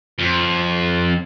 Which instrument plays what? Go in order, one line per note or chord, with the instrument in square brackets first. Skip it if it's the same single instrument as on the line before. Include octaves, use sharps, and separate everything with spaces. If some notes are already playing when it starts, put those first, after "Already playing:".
[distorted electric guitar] F2